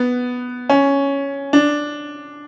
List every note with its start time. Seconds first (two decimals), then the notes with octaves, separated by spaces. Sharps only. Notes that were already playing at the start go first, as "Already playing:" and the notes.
Already playing: B3
0.69 C#4
1.53 D4